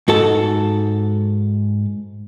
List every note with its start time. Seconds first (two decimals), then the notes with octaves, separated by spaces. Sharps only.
0.08 G#2 F#4 A4 A5